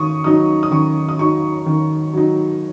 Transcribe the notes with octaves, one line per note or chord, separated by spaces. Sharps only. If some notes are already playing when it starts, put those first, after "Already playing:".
Already playing: D#3 C#6 D#6
F#3 D#4 D#6
D#6
D#3 C#6
D#6
F#3 D#4 C#6
D#3
F#3 D#4